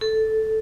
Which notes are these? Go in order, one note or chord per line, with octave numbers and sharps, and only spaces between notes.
A4